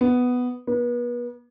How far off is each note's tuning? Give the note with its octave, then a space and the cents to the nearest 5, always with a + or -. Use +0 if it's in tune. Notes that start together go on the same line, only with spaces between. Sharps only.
B3 +5
B3 -35